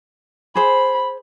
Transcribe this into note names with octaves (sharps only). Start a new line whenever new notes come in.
G#4 C5 B5